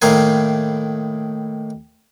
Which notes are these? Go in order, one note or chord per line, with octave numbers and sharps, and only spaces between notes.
A2 D#3 A#3 C5 G#5